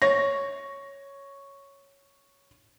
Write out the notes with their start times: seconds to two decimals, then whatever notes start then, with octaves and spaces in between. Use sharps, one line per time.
0.02 C#5 A#6